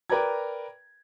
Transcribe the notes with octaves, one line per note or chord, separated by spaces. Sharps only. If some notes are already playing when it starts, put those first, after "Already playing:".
A#4 B4 D5 G5 A#5 G#6